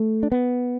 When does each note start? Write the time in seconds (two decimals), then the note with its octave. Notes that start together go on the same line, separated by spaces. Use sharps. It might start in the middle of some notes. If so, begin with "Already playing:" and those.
Already playing: A3
0.23 D4
0.32 B3